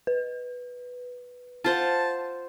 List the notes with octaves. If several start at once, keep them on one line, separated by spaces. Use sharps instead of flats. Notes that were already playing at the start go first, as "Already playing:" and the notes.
B4
F4 C5 F#5 A5